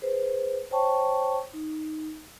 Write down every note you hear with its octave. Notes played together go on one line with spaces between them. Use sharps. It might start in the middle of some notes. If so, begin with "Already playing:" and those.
G#4 B4 C5
C5 C#5 G5 A5 C#6
D#4